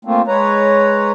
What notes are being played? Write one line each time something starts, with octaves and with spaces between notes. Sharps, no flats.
A3 A#3 C4 F4
G#3 B4 C#5 A#5